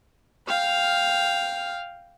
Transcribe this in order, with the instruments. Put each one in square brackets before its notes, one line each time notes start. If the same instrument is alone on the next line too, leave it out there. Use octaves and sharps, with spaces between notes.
[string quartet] F5 G5 F6